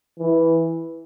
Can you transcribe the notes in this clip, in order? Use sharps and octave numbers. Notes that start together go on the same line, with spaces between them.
E3